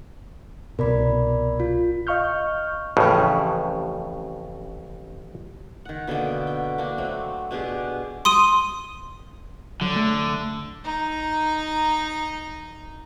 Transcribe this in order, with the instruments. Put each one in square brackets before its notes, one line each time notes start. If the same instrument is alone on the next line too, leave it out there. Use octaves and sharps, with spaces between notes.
[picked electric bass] C2 B2 [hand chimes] A#4 D5 B5
[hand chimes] F4
[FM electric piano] D#5 F5 C#6 F6 G6
[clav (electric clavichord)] A1 F2 A2 C#3
[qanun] D#3 F#5
B2 D3 A#3 G5
G5
A#3 D4 F#4
F#3 A3 C4
B2 D4 G4 G#4
[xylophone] C6 D#6 D#7
[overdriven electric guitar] D3 [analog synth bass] F#3
[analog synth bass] A3
[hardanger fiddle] D#4 A#5